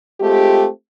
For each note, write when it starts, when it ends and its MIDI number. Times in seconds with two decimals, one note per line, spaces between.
0.21 0.68 56
0.21 0.68 57
0.21 0.68 60
0.21 0.68 65
0.21 0.68 67